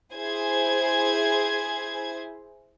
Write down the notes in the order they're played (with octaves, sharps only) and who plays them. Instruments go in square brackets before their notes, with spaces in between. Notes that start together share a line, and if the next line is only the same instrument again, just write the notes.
[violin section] E4 G#4 C5 G#6